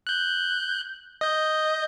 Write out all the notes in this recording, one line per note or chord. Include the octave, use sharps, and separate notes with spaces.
F#6 G6
D#5 G6